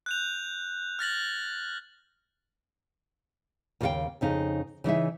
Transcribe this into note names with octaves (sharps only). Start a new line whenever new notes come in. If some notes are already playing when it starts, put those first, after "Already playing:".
F#6 G6 F7
F6 A6 A#6 F#7
D#2 C#3 F#4 A4 F5 G5
F2 C#3 D#4 F5
C#3 E3 D#4 E5